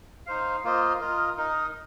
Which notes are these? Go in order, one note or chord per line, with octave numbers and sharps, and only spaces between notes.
D#4 C5 F5
A#3 F4 C5 D#5
F4 A#4 D#5
D#4 A#4 D#5